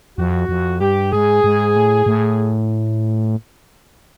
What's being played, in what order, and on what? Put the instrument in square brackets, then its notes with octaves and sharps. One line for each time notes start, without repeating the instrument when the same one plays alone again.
[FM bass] F2 [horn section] F#4
[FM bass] F2
[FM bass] G2 [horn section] G4
[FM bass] G#2 [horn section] G#4
[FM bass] G#2
A2
A2